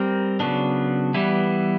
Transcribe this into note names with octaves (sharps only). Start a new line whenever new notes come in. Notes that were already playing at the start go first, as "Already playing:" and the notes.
Already playing: G3 C4 A#4
C#3 F#3 B3 D4
E3 G3 B3 E4